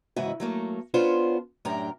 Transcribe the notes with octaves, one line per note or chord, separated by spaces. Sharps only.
G#2 C#3 E3 E4 F#4 D#5
F#3 A3 A#3
B3 C#4 D4 F4 C5
F#2 A2 D4 G4 A#4 A#5